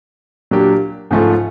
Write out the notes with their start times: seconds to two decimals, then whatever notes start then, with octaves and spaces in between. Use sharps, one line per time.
0.51 A#2 F#3 A#3 D4 G4
1.11 G#2 F3 A3 C#4 F4